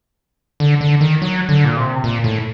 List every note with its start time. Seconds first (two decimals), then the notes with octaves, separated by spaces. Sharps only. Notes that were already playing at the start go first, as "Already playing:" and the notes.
0.60 D3
0.81 D3
1.01 D#3
1.22 F#3
1.49 D3
1.64 A#2
1.77 C3
2.04 A#2
2.24 A2